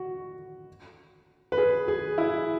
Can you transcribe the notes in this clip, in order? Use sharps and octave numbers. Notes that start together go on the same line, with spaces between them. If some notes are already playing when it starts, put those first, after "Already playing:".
Already playing: F#4
B4
G#4
G#4
E4